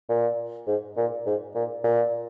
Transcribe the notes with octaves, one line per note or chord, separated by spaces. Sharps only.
A#2
G#2
A#2
G#2
A#2
A#2